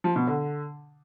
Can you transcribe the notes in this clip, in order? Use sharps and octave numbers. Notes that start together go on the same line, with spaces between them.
F3
B2
D3